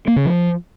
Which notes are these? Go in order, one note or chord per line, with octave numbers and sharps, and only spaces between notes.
A#3
C#3
F3